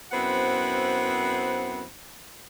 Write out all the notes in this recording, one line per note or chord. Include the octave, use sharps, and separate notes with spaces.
F#2 B3 C4 E4 C5 F#5